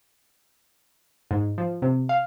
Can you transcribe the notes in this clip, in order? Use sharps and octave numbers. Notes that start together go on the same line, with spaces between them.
G#2
F3
C3
F5